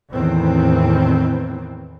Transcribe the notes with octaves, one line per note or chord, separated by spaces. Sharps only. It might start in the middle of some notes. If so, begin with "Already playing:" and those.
E2 A2 D#3 E3 C4